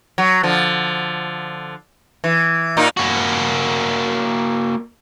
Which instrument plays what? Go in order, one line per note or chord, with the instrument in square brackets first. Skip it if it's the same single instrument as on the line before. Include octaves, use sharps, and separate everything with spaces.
[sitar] F#3
D3 F3
E3
A#2 A#3 D#4
[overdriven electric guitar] A#3 F#4